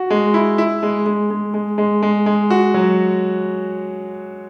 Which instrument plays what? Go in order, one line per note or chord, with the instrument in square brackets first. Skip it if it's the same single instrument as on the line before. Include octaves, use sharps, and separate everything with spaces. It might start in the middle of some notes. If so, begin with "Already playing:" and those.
Already playing: [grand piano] F#4
G#3
E4
E4
G#3
G#3
G#3
G#3
G#3
G#3
G#3
F#4
F#3